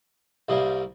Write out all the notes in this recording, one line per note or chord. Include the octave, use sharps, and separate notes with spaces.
C2 C3 G3 A#3